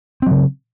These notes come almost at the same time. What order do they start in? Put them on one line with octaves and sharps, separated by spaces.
C4 F#3 C#3